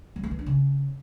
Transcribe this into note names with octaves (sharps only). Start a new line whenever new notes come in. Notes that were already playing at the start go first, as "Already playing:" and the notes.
F#3
A3
E3
D4
C#3